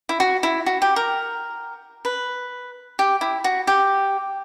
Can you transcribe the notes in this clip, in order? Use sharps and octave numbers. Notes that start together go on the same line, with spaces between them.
E4
F#4
E4
F#4
G4
A#4
B4
G4
E4
F#4
G4